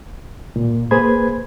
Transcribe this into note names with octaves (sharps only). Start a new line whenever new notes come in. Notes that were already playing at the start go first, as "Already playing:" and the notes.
A#2
A#3 G#4 B4 C5 B5 G#6